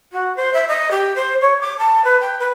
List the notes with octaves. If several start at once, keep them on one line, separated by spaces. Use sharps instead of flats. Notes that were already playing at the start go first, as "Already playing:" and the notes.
F#4
C5
E5
D#5
G4
C5
C#5
D6
A5
B4
G5
B4